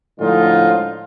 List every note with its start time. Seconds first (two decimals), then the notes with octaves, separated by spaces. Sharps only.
0.19 A2 D3 F3 G#3 D#4 F4